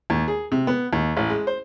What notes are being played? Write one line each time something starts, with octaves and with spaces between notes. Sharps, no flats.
D#2
G#4
C3
B3
D#2
A1
G#3
C5